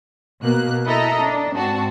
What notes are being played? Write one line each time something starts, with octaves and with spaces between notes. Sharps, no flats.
B2 A#3 F#6
E4 A4 D#5 A#5
D4
G#2 C4 F#4 A5